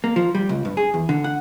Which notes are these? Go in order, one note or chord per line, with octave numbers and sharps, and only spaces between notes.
A#3
F3
G3
C#2
G2
G#4
E2
D3
F#5